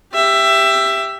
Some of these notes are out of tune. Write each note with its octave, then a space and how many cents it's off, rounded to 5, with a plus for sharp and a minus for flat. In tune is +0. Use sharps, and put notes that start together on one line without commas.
G4 +5 E5 +15